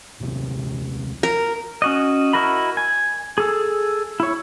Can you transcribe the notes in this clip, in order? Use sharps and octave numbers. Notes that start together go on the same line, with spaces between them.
D#1 C2 C3
A#4
C#4 F#4 D#5
E4 F#4 A#4 D#5 B5
G#5
G#4 A4
E4 C#5